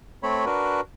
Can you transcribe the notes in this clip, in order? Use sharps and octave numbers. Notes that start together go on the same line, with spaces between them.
A3 C4 C#5 B5
D4 F#4 A#4 B4